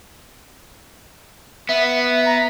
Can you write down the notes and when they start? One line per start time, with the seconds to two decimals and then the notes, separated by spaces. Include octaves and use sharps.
1.69 B3 E5
2.26 A#5